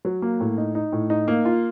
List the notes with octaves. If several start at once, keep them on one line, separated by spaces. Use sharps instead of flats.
F#3
A#3
A2
D#4
D#4
A2
D#4
A#3
F4